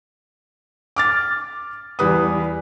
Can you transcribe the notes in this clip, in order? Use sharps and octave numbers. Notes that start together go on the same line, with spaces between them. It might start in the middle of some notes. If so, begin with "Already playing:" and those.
D6 F6 A6
E2 G3 B4 D#6